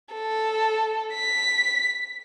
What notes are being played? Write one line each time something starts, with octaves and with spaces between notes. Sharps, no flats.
A4
B6